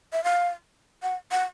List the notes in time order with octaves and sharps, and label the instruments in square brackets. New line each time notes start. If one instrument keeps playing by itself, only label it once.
[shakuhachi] E5
F5
F#5
F#5